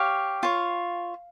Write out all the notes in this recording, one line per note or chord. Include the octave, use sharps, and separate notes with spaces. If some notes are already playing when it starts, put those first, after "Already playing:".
Already playing: G4 C#5 F5
F4 C#5